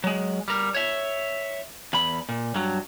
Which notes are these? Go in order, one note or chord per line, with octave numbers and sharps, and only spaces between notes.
F#3 G#3
G3 A#4
C#5 E5
E2 B5
A#2
G2 F#3